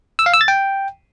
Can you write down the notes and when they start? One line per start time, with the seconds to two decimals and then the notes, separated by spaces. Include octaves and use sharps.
0.19 E6
0.26 F5
0.34 E6
0.41 A6
0.48 G5